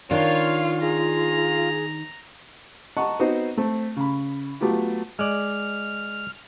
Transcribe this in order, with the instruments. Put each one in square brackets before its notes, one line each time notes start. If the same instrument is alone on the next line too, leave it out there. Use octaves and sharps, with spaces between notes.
[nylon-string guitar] D#3 D4 [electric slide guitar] F4 [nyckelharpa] C#5 F5
[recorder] G#4 [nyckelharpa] A#5
[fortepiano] D#5 F#5 A5 A#5 C#6
B3 C4 D#4 F#4 C5 D#5
A3 C4
C#3 B5
F#3 A3 B3 F4 G4
[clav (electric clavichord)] G#3 D5 [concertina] F6